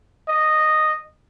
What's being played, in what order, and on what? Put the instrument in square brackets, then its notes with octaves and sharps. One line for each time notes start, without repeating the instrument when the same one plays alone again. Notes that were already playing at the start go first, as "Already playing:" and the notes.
[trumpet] D#5